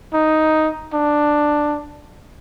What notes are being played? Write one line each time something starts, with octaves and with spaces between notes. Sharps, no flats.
D#4
D4